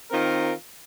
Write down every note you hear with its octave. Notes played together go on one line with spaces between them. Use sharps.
D#3 C4 F4 A#4